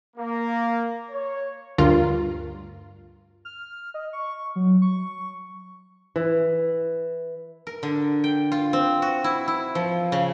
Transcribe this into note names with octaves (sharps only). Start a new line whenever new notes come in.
A#3
C#5
D2 G2 F4 A#4
F6
D#5
C#6
F#3
C#6
E3
A#4
D3
G5
F4
C4
F#4
E4
E4
F3
C#3